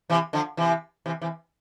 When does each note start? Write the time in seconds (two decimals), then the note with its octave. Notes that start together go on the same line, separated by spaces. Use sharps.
0.10 C3 E3
0.33 D3 F3
0.57 C3 E3
1.06 C3 E3
1.22 C3 E3